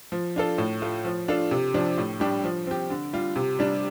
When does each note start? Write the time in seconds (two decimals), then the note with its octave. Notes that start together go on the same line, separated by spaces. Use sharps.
0.12 F3
0.36 D4 F4 A4
0.58 A2
0.82 A3 F4
1.05 F3
1.28 D4 F4 A4
1.51 C3
1.74 F3 D4
1.98 A2
2.20 G3 D4 G4
2.44 F3
2.67 C4 G4
2.90 D3
3.13 G3 F4
3.36 C3
3.59 G3 D4